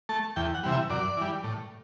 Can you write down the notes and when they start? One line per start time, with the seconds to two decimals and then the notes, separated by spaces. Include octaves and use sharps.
0.09 A3 A5
0.36 E2 G5
0.54 F#5
0.63 C3 E3 G3
0.72 E5
0.90 F#2 D5
1.17 E3 G3
1.44 A2